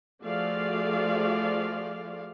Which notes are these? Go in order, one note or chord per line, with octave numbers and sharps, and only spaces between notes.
F3 A3 F#4 G#4 D5 F5